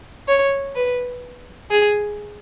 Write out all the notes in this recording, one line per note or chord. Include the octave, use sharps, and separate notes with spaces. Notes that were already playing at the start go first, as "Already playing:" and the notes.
C#5
B4
G#4